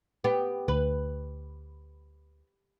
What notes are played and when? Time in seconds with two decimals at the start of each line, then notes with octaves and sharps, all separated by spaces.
0.24 B3 G4
0.68 D2 B4